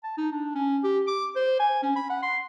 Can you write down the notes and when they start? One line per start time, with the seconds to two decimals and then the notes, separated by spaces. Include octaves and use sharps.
0.04 A5
0.18 D#4
0.32 D4
0.55 C#4
0.83 G4
1.07 D6
1.36 C5
1.59 G#5
1.83 C#4
1.96 B5
2.10 F#5
2.22 C6